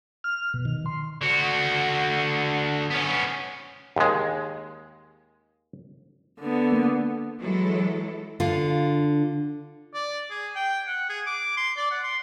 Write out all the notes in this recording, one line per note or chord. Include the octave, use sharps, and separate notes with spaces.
F6
B2
D#3
C6
D3 F#4
B3 C#4
D#2 G#3
D3 B3
A#3
E3 F#3 G#3 E4 A4
D3 F4
D5
G#4
G5
F#5
G#4
D6
C6
D5
F#5
C6